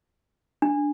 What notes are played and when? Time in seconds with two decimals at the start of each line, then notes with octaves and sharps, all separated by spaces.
0.62 D4